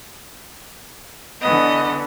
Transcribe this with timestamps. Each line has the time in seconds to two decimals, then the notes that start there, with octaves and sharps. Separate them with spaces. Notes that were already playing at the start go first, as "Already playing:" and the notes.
1.42 D3 E3 B3 D#5